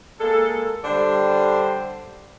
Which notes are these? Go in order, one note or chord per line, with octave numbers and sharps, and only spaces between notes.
G#3 A#3 A4
D3 G3 D4 C5 G5